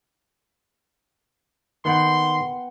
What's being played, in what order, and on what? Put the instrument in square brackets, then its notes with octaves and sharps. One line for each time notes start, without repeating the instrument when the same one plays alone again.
[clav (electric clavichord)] D#3 [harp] B3 F#5 G5 [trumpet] C6